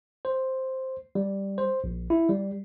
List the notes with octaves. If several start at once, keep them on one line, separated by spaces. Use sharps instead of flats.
C5
G3
C5
A#1
E4
G3